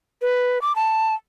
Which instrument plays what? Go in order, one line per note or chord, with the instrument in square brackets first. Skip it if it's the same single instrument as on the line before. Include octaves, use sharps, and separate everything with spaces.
[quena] B4
D6
A5